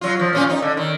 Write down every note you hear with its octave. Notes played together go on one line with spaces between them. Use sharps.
F#3 F4
F3
A#2 C#4 F4
D#4
D3
D#3